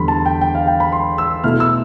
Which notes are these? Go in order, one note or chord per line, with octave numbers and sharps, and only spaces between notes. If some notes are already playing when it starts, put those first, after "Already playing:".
Already playing: E2 D3 G3 B5 C6
A5
G5
G5
F5
G5
B5
C6
E6
B2 A3 E4 F6
E6